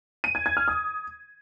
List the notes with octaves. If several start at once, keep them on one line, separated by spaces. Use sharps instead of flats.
D#7
G#6
G#6
F6
D#6